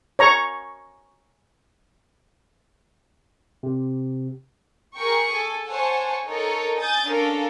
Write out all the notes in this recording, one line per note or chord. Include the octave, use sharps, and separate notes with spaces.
C#5 A#5 C#6
C3
G#4 A#4 G5 C#6
A4 G#5
C5 C#5 F#5 G#5 A5
D#4 A4 A#4 C#5
G#5 D#6 G6 A6
C#4 D4 A4 A#4 F5